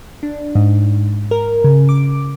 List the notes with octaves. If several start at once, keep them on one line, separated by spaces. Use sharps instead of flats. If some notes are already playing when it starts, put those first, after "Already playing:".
D4
G#2
A#4
C#3
D6